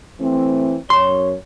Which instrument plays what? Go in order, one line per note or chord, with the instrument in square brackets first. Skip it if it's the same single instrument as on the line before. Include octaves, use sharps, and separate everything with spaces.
[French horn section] E3 A3 C4
[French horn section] F#2 C#5 [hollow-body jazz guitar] C6